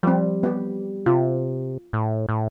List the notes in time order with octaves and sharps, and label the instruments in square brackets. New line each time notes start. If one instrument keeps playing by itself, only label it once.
[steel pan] F3 C4 [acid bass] G3
[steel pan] B3 G4
[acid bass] C3 [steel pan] F4
[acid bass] A2
A2